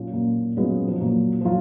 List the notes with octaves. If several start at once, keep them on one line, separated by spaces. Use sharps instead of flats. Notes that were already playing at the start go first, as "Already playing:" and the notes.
Already playing: A#2 F#3 C#4 F4
A#2
F#3 G#3 B3 C#4 F4
F3
A#2 F#3
F3
F#3 F4